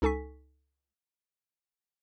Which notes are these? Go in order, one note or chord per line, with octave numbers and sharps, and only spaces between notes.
C#2 D#4 A4 G#5 C#6 B6